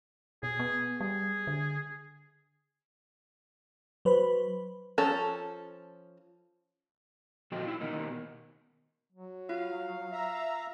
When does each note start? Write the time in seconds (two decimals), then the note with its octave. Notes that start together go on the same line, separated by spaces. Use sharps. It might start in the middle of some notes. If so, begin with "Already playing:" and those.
0.43 B2 G#4
0.59 B3
1.01 G3 G#4
1.47 D3
4.05 F#3 B4 C5 B5
4.98 F3 C#4 A4 A#5
7.52 A#2 F3 F#4 A4 D#5 G5
7.65 E4 F4
7.81 B2 D#3 A#3 D#4
9.12 F#3
9.49 F4 F5
10.12 E5 A#5